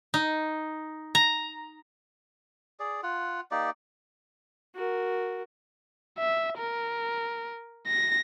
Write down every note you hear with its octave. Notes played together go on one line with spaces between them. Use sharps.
D#4
A#5
G#4 D5
F4 F#5
A#3 D#4 G4 D5
F#4 A#4
E5
A#4
A#6